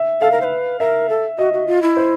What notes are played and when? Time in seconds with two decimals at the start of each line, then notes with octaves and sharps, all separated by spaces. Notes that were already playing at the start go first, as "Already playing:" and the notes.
Already playing: E5
0.21 A4 F5
0.31 A#4
0.41 C5
0.44 B4
0.79 A#4 E5
1.09 A4
1.38 F#4 D#5
1.53 F#4
1.67 F4
1.82 E4
1.97 C5